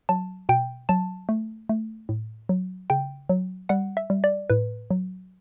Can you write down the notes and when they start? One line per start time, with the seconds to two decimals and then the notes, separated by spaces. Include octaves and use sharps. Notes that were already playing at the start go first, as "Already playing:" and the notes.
0.09 F#3 A5
0.49 B2 G5
0.89 F#3 A5
1.29 A3
1.69 A3
2.09 A2
2.49 F#3
2.90 C#3 G5
3.29 F#3
3.69 G3 F#5
3.97 E5
4.10 G3
4.24 D5
4.50 A2 B4
4.91 F#3